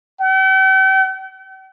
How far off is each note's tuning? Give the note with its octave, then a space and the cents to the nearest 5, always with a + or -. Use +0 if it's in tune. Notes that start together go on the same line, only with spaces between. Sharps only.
G5 -45